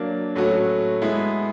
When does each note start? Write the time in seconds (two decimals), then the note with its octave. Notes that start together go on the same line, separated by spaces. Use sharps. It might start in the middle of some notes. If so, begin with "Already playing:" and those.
Already playing: F#3 A#3 D4
0.35 A2 F#3 A3 C#4 F#4
1.02 G#3 B3 E4